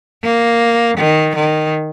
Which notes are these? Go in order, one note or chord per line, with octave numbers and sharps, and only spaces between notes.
A#3
D#3
D#3